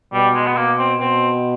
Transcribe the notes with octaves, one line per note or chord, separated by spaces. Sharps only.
B2 G3
G#3
B3
B2 A#3
C4
B2 C4